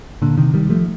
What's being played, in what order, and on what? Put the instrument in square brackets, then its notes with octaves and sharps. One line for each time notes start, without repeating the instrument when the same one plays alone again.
[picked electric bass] A#2 D3
C3 D#3
D#3 G3
F3 A3